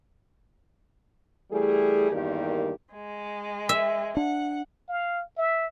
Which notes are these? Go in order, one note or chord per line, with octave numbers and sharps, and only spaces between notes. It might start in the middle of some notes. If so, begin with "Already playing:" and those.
E3 G3 A3 G#4
E2 G2 D#3 A#3 G4 A#4
G#3
E5
D4 F#5
F5
E5